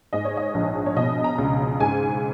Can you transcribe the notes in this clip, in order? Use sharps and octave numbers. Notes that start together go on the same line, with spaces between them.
G#2 D#5
C#5
D#5
A#1
C#5
B2 D#5
A#5
C#2
G#2 G#5